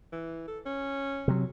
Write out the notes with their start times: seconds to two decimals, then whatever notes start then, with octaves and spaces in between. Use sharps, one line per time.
0.12 E3
0.48 A4
0.66 C#4
1.28 C3 F#3